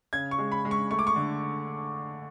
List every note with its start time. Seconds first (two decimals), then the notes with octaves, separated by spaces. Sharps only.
0.13 C#3 G#6
0.31 C#6
0.38 G#3
0.52 B5
0.65 G#3
0.71 C#6
0.91 A3 C#6
0.99 D6
1.07 C#6
1.16 D3